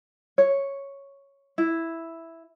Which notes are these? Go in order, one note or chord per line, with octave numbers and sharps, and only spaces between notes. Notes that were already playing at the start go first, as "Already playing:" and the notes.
C#5
E4